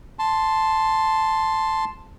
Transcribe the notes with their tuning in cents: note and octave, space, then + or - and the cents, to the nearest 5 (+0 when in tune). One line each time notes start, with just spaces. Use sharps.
A5 +0 C6 +0